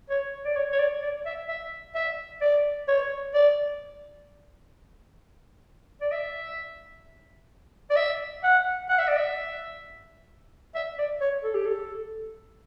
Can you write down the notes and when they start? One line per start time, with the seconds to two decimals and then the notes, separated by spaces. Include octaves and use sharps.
0.10 C#5
0.45 D5
0.56 C#5
0.72 C#5
0.79 D5
1.03 D5
1.26 E5
1.49 E5
1.95 E5
2.41 D5
2.88 C#5
3.34 D5
6.01 D5
6.12 E5
7.90 D5
7.96 E5
8.43 F#5
8.89 F#5
8.99 E5
9.08 D5
9.17 E5
10.75 E5
10.98 D5
11.21 C#5
11.44 A4
11.55 G4
11.66 A4